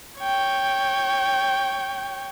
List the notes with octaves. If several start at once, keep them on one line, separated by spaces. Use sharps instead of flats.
C#5 G5